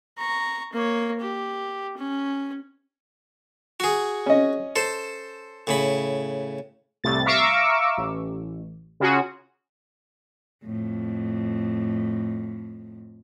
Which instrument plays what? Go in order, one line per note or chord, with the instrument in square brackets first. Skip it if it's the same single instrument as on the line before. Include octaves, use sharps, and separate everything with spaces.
[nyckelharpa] A#5 C#6
A#3 C#5
G4
C#4
[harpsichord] F#4 G#4
[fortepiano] C#4 D#5
[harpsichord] A4 C5
A2 C#3 B5
[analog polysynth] C2 A2 A6
E5 F5 A#5 C#6 D6 E6
A1
C#3 F4 F#4 G#4
[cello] F2 A2